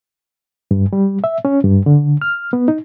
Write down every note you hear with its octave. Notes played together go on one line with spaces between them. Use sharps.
G2
G3
E5
C#4
G2
D3
F6
B3
D#4